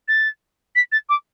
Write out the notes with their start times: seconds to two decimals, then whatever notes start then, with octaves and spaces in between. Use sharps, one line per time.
0.08 A6
0.76 B6
0.92 A6
1.09 D6